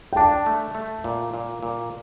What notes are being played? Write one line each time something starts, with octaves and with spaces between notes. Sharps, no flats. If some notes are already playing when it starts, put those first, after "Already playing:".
G5
D4 A5
A3
A3
A#2
A#2
A#2